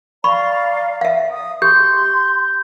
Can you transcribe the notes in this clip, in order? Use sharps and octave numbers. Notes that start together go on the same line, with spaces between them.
D5 F5 A#5 B5 C#6
E5 F5
D#6
G4 C6 G6